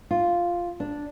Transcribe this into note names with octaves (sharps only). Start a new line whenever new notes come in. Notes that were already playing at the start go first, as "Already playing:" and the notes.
F4
D4